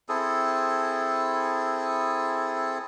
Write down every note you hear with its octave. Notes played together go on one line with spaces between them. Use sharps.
C4 E4 G#4 A4